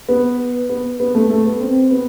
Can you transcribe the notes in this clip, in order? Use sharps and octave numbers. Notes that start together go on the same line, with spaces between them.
B3
B3
B3
A3
A3
B3
C4
B3